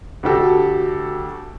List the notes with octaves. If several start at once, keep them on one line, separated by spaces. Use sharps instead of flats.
D2 F#4 G4 A4